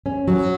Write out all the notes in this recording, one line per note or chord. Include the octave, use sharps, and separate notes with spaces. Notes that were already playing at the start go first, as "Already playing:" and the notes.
C#4
F#3